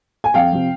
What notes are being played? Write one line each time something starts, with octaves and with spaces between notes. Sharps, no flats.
G#5
F2 F5 G5
C3 F3